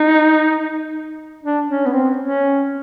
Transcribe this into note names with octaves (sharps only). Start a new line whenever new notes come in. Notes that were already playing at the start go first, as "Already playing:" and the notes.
Already playing: D#4
D4
C#4
B3
C4
C#4